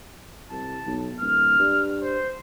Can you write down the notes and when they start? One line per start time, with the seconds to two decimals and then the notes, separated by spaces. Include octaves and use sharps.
0.51 C2 A5
0.86 B1
1.21 D1 F6
1.59 G2
2.02 C5